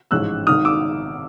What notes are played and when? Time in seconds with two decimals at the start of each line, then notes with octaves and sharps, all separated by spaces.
0.11 A1 G#2 F3 G#3 C#4 E6 F#6
0.47 G#1 G#2 D#3 D#6 F6
0.65 D6 E6